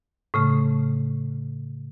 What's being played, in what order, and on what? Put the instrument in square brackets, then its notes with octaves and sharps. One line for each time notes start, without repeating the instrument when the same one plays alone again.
[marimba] A2 C#3 A3